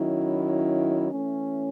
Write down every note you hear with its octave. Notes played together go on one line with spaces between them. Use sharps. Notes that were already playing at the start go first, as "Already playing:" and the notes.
Already playing: D#3 F#3 C#4 E4
E3 A3 C#4